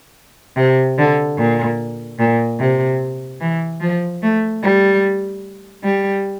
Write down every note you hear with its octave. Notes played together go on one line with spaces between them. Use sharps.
C3
D3
A#2
A#2
C3
E3
F3
A3
G3
G3